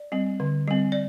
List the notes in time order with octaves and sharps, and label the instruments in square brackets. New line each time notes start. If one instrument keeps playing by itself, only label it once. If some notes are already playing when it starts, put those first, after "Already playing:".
Already playing: [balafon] D5
G3 C4
D3
G3 C4
D5